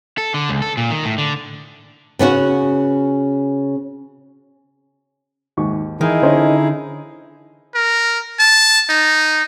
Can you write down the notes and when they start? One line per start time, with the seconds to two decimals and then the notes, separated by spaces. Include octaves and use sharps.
0.18 A4
0.34 D3
0.49 C#2
0.62 A4
0.77 A#2
0.91 D#3
1.05 A2
1.18 D3
2.19 C#3 B3 C#4 F#4
5.57 D#2 G#2 C#6
6.01 D#3 E3 D#4 E4 G#4
6.22 D3 C#4 C5 D#5
7.75 A#4
8.40 A5
8.90 D#4